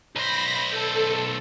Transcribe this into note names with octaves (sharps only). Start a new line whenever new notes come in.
B1 C5 B5 A#6
A4